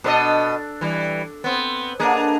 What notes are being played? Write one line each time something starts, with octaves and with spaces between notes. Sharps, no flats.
B2 D4 A4 B4 D#5
E3 G3
B3 C4
D3 A#3 D4 G#4 D#5